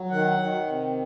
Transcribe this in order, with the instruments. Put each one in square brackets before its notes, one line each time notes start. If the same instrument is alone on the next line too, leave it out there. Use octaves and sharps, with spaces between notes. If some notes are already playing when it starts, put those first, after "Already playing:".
Already playing: [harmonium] F#3
D#3 F#5
D#3
C3